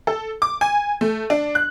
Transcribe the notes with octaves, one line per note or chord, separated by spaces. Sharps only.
A4
D6
G#5
A3
D4
F#6